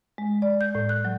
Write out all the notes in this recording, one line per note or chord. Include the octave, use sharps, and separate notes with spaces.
G#3
D5
G6
A2
F#6
F#3